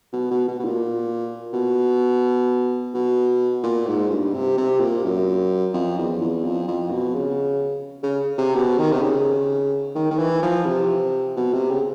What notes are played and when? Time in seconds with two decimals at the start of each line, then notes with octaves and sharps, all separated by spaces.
0.13 B2
0.31 B2
0.48 B2
0.60 B2
0.65 A#2
1.54 B2
2.94 B2
3.63 A#2
3.87 G#2
4.11 G2
4.33 C3
4.58 C3
4.80 A#2
5.04 F#2
5.74 F2
5.98 E2
6.21 E2
6.44 F2
6.68 F2
6.91 B2
7.14 C#3
8.03 C#3
8.38 C3
8.55 B2
8.78 D#3
8.92 C3
9.02 C#3
9.95 D#3
10.11 D#3
10.19 E3
10.43 F3
10.66 C3
11.37 B2
11.54 C3
11.71 C#3